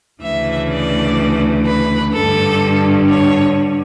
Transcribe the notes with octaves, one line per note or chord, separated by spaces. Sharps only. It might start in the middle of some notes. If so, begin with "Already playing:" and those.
D2 C#3 E3 E5
D5
B4
G2 D3 A4
C#5